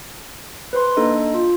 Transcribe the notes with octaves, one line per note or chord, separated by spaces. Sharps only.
B4 C5 C6
A#3 D4 D#4 A4 D#5
F4